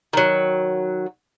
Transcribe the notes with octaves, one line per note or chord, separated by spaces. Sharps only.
D#3 F#3